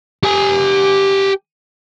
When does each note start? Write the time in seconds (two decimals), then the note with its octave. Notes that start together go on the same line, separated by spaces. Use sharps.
0.24 G4 G#5